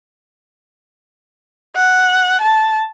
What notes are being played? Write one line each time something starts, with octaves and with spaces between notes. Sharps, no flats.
F#5
A5